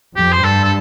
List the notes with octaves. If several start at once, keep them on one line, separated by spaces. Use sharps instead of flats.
F2 G4
C5
G2 A4
A4